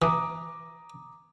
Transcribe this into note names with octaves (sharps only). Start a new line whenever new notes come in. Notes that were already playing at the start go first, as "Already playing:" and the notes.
E3 A#5 D6 D#6